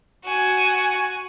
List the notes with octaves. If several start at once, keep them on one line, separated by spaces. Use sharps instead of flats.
F#4 G#5